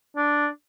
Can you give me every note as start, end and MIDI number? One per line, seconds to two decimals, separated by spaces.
0.17 0.47 62